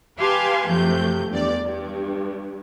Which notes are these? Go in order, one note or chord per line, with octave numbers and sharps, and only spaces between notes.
G4 B4 F5 G#5 A5 C6
F#2 C3 F3 A3 G6
E2 G2 D5
G2